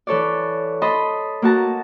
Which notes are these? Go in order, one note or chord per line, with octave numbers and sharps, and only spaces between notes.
E3 A4 C#5 D5
D#5 A5 B5 C6
A#3 F#4 A5 A#5